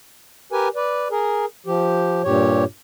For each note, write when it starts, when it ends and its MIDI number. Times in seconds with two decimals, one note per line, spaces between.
0.52 0.68 67
0.52 0.68 70
0.52 0.68 71
0.52 0.68 80
0.75 1.08 71
0.75 1.08 74
1.11 1.45 68
1.11 1.45 70
1.66 2.22 53
1.66 2.22 67
2.24 2.64 43
2.24 2.64 46
2.24 2.64 67
2.24 2.64 73